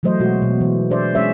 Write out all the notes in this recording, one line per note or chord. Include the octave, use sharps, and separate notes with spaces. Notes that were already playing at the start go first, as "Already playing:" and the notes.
E3 F#3 A3 C5 D#5
B2 G#3 F#4
B2
E3 C5
D4 G#4 C5 D5 E5
G#3 C#4 E4 G#4 C#5 E5